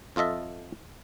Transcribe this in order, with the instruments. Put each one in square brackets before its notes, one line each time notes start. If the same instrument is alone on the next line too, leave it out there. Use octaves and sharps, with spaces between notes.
[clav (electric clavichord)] F2 F4 A4 D#5 E5